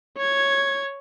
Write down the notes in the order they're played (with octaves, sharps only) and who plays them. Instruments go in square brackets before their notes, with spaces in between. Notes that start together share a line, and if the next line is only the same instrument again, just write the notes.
[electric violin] C#5 G#6